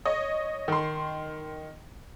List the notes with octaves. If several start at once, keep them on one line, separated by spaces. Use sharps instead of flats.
C#5 D#5
D#3 C6